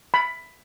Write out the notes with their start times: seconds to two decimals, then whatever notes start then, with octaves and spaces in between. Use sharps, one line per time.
0.14 B5